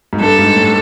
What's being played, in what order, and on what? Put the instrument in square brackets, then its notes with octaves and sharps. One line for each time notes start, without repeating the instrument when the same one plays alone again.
[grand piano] G#2
[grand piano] G2 [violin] A4
[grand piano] G#2
A2